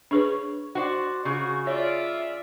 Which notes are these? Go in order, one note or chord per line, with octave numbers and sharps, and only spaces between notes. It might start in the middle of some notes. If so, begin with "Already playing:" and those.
D4 G#4 B4 C#5
F#4 C5 D5
C#3 F#4 G#4
F4 C#5 D5 E5